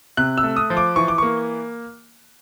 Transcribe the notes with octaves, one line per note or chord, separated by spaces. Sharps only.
C3 F#6
E6
A3
D#6
F3
D6
E3 C#6
D6
A#3 C#6